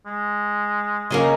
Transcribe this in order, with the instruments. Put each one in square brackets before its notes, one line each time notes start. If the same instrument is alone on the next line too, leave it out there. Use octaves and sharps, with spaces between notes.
[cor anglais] G#3
[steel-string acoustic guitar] C#3 C#4 A#4 [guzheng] A#3 G#4 D#5